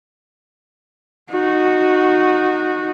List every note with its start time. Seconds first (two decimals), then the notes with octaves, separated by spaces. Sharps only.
1.31 D#4 F#4